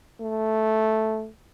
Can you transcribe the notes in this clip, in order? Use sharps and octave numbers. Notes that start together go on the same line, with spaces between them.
A3